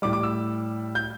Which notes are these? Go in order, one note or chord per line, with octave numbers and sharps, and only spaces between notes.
A2 G3 D6
D6
E6
G6